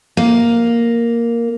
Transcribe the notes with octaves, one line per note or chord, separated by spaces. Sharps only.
A#3